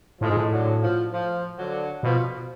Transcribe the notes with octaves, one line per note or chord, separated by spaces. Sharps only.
A2 F3 G#3
G#2
A2
D3 F#3
F3
F3
D3 F#3
B2 F3